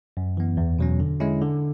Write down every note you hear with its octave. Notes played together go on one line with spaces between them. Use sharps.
F#2
E3 B3
E2
B2 F#3 C#4
D3
G#3 C#4 E4
D3